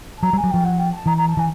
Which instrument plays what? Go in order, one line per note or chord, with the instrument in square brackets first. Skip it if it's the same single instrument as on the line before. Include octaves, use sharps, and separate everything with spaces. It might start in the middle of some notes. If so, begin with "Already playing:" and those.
[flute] A5
[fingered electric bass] F#3 [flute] A#5
[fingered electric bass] G3
[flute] G#5
[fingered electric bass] F#3
[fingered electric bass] F3 [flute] G5
[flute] F#5
G5
A5
[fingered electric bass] E3 [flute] A#5
[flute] A#5
A5
[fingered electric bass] E3 [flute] G#5